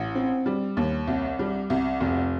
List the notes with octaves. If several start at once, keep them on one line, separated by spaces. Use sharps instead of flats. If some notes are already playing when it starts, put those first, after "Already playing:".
Already playing: A1
C4
G3
D#2
C2
G3
C2
F1